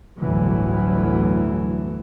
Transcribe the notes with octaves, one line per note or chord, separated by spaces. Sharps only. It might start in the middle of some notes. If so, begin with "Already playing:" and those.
G1 D2 A2 E3 F#3